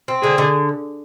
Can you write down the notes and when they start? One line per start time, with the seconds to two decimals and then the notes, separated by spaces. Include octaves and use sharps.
0.08 C4
0.23 D3 G#4
0.38 D3